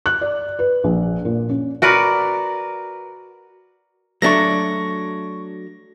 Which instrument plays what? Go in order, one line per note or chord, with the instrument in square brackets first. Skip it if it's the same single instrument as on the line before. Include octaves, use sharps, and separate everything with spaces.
[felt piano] F#6
D5
B4
A#1
A#2
C#4
[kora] F#4 A#4 B4 D5
[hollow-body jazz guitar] F#3 A3 D4 [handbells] C#6 A#6